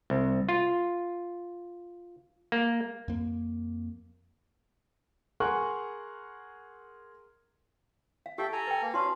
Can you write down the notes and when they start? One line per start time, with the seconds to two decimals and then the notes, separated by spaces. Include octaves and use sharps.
0.10 C2
0.49 F4
2.52 A#3
3.08 F2 A#3
5.40 G#4 A#4 F#5 C6 C#6 F#6
8.26 F5
8.38 G4 A4 E5 F5 G5
8.52 A4 G#5 A#5
8.67 B4 G5
8.82 A#3
8.94 C#4 D4 F#4 F5 C6